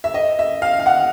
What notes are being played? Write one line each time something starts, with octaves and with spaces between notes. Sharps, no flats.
E5
D#5
E5
F5
F5
F#5